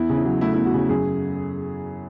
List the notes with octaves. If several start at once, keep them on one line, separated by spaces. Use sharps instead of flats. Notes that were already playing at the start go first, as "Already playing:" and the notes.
Already playing: E2 E4
C#3
E4
F#3
A3 E4
E2 E4
F#4
C#3
F#2 G#4